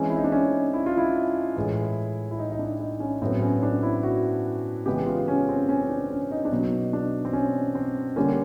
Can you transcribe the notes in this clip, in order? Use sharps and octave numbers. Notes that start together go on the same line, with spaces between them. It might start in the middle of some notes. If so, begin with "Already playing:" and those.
Already playing: E3 G#3 C4 C#4
E4
D#4
D4
C#4
E4
F4
E4
A2 E3 G#3
E4
D#4
D#4
D4
D#4
C#4
A2 F#3 B3 C4
C#4
D4
E4
F#4
C#3 E3 G#3 B3 G4
F4
C#4
C4
C#4
D4
C#4
D#4
D4
B2 F#3 B3 D#4
D4
C4
C#4
C4
D3 G3 A#3 C#4